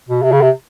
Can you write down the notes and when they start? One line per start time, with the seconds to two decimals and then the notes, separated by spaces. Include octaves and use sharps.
0.09 B2
0.23 C3
0.32 C#3
0.42 C3